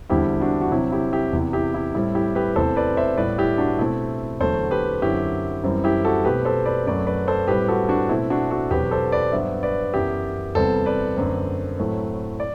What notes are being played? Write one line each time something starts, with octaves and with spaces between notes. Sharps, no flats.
E2 D3 G3 C4 E4 G4
D4 F#4
F#4
C3 F#3 C4 E4
E4 G4
E4 G4
E2 C3 E3
E4 G4
E4
A2 G3 C4 E4
E4 G4
G4 B4
E2 C3 E3 A3 A4 C5
B4 D5
C5 E5
A2 G3 B3 B4 D5
E4 G4
D4 F#4
B2 A3 C4 E4
E2 D3 F#3 A3 A4 C5
G4 B4
F#2 D3 F#3 C4 E4 G4
F#2 E3 G3 C4
E4 G4
F#4 A4
B2 A3 C4 G4 B4
A4 C5
B4 D5
F#2 F#3 A3 C4 B4 D5
B4 D5
A4 C5
A2 G3 C4 G4 B4
F#4 A4
D4 F#4
B2 A3 C4 E4
D4 F#4
F#4 A4
E2 B2 F#3 C4 G4 B4
A4 C5
B4 D5
G2 F#3 B3 C5 E5
B4 D5
F#2 E3 B3 E4 G4
E2 C3 G3 B3 A4 C5
B4 D5
F#2 D3 A3 C4
A2 F#3 A3 C4
D5